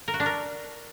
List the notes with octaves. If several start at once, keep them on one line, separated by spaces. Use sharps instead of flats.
A#4
F#4
D4
A#4